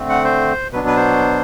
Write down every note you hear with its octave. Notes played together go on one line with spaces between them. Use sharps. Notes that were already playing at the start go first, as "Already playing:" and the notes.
Already playing: D3 A3 C4
F#5
C5
B2 F#3 B3 D4 B4
B4
C5